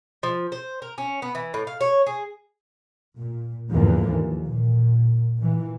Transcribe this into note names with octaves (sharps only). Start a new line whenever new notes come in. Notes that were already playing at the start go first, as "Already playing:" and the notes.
F3
C5
A#4
C#4
B3
E3
A2
F5
C#5
G#4
A#2
E2 G#2 D3 E3 F3 A#3
D#2
A#2
A#2 E3